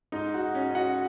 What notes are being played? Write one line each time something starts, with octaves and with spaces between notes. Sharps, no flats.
G#2 D#4 D#5
F#4 F#5
C#4
D#5
F#4 F#5